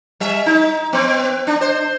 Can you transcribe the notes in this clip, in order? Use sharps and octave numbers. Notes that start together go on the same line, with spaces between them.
G3 E5
D#4
B3 C4
D4
C5